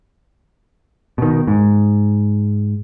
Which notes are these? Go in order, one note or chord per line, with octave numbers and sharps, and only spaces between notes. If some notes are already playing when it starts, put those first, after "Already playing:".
B2 D#3
G#2